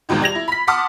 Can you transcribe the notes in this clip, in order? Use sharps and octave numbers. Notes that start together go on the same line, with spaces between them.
G#1 E2 B2 D#3
G3 G#6 A#6 F7
E4
B5 B6
F#5 A5 C6 D6 D#6 F6